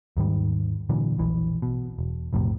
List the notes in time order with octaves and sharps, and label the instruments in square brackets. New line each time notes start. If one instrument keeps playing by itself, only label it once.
[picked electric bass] D#2 G#2 D#3 G3
A#2 D3 E3 F#3
E1 A#1 E3
B2
E1
B1 F2 A2 C3